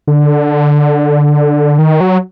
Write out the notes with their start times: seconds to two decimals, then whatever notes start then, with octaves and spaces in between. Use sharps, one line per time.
0.08 D3
1.79 D#3
2.01 F#3